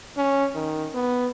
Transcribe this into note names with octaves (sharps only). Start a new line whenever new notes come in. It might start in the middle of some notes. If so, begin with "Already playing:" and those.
C#4
D#3
B3